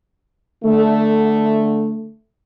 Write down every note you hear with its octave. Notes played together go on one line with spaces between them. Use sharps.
D3 A3